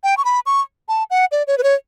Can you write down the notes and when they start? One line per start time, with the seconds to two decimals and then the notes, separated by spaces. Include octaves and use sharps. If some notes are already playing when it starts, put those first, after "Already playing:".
0.04 G5
0.17 C#6
0.25 B5
0.46 C#6
0.88 A5
1.10 F#5
1.32 D5
1.47 C#5
1.58 B4
1.63 C#5